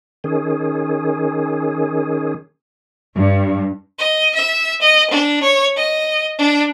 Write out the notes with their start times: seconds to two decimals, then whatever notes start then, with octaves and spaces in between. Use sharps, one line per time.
0.24 D#3 C#4 G#4
3.16 G2
3.98 D#5
4.34 E5
4.81 D#5
5.10 D4
5.42 C#5
5.76 D#5
6.38 D4